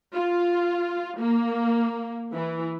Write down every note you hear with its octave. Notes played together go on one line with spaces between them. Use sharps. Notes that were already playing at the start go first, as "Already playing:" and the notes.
F4
A#3
E3